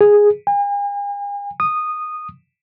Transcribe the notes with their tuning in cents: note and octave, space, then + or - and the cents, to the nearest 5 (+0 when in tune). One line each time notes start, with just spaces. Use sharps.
G#4 -5
G#5 -45
D#6 -10